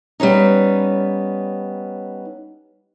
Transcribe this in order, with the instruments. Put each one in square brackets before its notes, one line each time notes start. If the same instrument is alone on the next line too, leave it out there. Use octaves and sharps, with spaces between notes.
[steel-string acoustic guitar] G3 B3 C#4 D#4